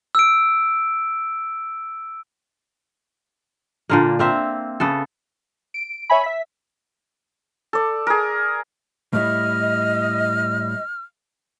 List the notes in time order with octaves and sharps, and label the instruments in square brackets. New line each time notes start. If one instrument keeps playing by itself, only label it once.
[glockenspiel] E6 D7
[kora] A#2 D3 A#3
A#3 C4 E5
C#3 B3 A4
[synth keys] D7
C#5 E5 G#5 B5
E5 B6
[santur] A4 D5
G#4 A#4
[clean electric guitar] A2 G3 E4 [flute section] D#5 [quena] F6